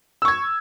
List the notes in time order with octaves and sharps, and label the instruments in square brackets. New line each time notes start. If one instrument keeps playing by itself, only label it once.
[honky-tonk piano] E6
C#6
G#6